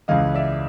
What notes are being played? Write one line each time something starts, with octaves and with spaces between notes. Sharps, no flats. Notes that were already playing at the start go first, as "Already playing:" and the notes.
C#2 C#3 E3 D#5 F5
D5 E5